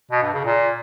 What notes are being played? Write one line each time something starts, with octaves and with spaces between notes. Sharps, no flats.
B2
G2
C#3
A#2